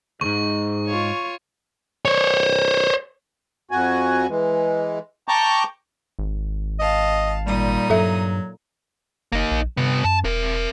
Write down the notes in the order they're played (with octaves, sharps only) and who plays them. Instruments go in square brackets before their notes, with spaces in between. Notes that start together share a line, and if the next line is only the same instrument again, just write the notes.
[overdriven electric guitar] D2 G#2 [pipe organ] D#4 G#4 [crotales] C#6
[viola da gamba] F4 C#5
[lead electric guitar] C5 C#5
[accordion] F2 F#4 G#5
E3 G#3
G5 A5 A#5 C#6 D6 G6
[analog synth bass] G#1
[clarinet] D#5 [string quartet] F5 A5
[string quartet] A#2 D#4 D#6 [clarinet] G3
[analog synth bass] G2 [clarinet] F#3 [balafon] A4 E5
[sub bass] F#1 [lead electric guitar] A#3 D#4
[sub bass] A#1
[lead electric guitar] G2 B3 [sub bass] C3
[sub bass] F#2 [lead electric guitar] A5
[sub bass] E1 [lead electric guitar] C4 A#4